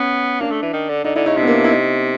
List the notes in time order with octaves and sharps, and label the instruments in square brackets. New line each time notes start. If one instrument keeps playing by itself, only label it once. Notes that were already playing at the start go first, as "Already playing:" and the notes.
Already playing: [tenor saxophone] B3 [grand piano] C#4
[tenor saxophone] A#3 [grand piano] D4
[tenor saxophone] A3
E3
D#3
D3
[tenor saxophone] D3 [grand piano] D#4
[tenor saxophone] D3 [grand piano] E4
[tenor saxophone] C#3 [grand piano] D#4
[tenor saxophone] C3 [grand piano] D4
[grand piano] B3
A#3
D4
E4
D#4